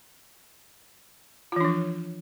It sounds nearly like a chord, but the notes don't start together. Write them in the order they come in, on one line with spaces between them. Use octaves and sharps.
F4 E3 D4 F3